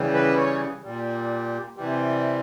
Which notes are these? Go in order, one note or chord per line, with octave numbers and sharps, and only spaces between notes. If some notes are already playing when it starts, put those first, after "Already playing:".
Already playing: C#3 E3 G3
B4
C#5
A#2 G3
C3 E3 G3